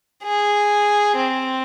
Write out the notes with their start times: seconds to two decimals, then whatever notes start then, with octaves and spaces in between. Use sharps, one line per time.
0.23 G#4
1.17 C4